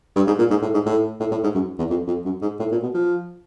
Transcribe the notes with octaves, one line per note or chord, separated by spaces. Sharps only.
G2
G#2
A#2
G#2
A2
G#2
A2
A2
A2
G#2
F#2
E2
F2
F2
F#2
G#2
A2
A#2
B2
F3